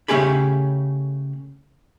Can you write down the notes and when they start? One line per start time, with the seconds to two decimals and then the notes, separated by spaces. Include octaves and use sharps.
0.08 C#3 A3 C#4 G4 G#4 B5